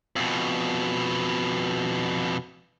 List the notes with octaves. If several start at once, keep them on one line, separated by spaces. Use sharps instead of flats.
F2 B2